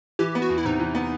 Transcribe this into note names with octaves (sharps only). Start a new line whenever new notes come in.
E3 G4
B3
F#4
E2
E4
C3 D#4
E3
B3